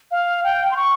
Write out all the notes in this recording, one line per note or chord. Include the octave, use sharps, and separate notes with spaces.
F5
G5
C6
C#6